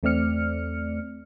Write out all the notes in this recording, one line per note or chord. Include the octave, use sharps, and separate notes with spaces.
E2 A3 C4 D5 F6 C#7